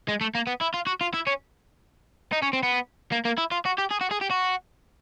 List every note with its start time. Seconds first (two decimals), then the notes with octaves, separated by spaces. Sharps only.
0.08 G#3
0.21 A3
0.35 A#3
0.47 B3
0.61 E4
0.74 F4
0.87 F#4
1.01 F4
1.14 E4
1.27 C#4
2.32 D#4
2.42 C#4
2.53 C4
2.63 B3
3.12 A#3
3.25 A#3
3.38 E4
3.52 F4
3.66 F#4
3.78 G4
3.91 G#4
4.01 F#4
4.11 G#4
4.21 G4
4.31 F#4